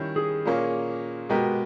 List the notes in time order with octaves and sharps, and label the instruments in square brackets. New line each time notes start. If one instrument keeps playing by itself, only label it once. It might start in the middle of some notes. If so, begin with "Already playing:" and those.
Already playing: [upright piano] D#3 G3 C#4 E4
[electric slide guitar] G#4
[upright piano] A#2 A#3 C#4
B2 G#3 B3 G4 A#4